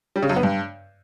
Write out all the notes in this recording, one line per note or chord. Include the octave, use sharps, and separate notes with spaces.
G3
C#3
F#2
B3
G2